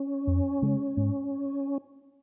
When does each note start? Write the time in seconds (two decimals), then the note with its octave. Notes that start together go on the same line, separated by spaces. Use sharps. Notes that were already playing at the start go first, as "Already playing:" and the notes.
Already playing: C#4
0.27 F2
0.62 C#3 G#3
0.97 G#2